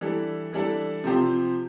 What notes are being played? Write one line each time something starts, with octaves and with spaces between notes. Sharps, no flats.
E3 G3 D4 A4
E3 G3 D4 A4
C3 F3 C4 G4